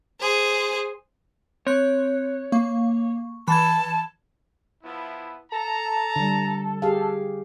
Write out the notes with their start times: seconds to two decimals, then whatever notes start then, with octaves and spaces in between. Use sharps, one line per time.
0.21 G#4 C5
1.67 C4 C#5 F#6
2.52 A#3 C#6
3.48 E3 A5 B5 G#6
4.83 F3 B3 E4
5.52 A4 A5 A#5
6.16 D3 G3
6.82 G4 G#4 F5